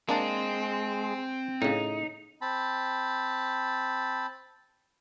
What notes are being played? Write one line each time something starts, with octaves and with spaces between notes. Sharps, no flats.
G#3 A#3 C4 D4 A5
A2 C#3 D#4
C4 A5 B5